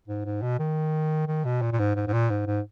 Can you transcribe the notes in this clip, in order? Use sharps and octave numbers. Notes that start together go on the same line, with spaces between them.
G#2
G#2
B2
D#3
D#3
B2
A#2
A#2
G#2
G#2
G#2
A#2
G#2
G#2